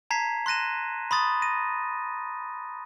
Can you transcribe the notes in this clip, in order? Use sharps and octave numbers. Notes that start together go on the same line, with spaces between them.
A5 A#5 G#6 B6 C7
C6 F#6 A#6 D#7 E7
B5 C6 D#6 A6
A#6 D#7